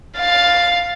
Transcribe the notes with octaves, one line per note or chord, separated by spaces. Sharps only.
F5 A6